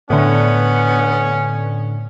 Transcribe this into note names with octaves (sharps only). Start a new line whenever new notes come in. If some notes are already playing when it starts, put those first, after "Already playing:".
A2 D3 B3 C#4